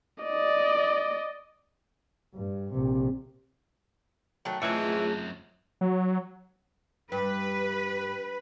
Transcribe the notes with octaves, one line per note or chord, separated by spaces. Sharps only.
D5 D#5
G2
A#1 C3
D#3 F#3 A3
F#2 E3 F#3 G#3 A3 C4 F4
F#3
G2 B4